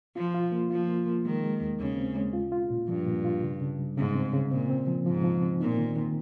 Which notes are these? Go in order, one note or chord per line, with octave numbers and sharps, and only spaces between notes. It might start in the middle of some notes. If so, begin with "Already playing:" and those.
F3 F4
F4
A#3
F3 F4
A#3
A#3
D#3 G#3
G#3
D#2
D#2 C#3
C4
G#3
F4
F4
A#2
G2 F3
A#2
F4
C#3
C#3
G3
G#2 C#3
C4
C#3
A#2 C4
C4
F3
G#2 F3
F3
C4
A#2 D#4
D#3
D#3